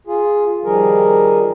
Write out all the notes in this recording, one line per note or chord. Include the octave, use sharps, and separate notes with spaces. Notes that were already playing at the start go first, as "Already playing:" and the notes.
F4 G#4
D#3 F3 G3 G#4 A#4